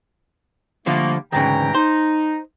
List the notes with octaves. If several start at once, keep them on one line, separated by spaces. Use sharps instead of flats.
D3 F3 G3 A3 A#3
D2 G#2 C#3 E3 G5 A#5
D#4 C5